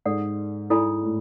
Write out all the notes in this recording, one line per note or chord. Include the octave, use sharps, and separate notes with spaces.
G#2 A4 D5 F#5
G#2 E4 A4 D5 G#5 B5
A2